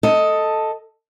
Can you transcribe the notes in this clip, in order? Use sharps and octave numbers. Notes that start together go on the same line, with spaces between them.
A4 D#5